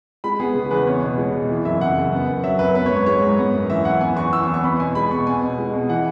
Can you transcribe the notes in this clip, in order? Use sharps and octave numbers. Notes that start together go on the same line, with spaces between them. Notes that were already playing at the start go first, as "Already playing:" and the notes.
G#3 B5
B3 G#4
C#3 G#4
E2 B4
B3 C#5
B2
G#3
B2
E3
F#2 E5
C#3 F#5
F#2
B3
F#2
F#3 E5
F#2 B4
B3 B4
C#5
G#2
C#5
G#3 C#5
G#2
B3
F#2
E3 E5
F#2 F#5
B3 G#5
E2 C#6
E3 E6
C#6
E2
C#6
B3 B5
B2 G#5
G#3 B5
B2 C#6
B3 G#5
B2
G#3
B2
E3 F#5